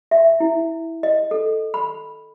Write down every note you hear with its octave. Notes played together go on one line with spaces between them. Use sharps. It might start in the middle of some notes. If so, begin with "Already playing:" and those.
E5
E4
D#5
A4
B5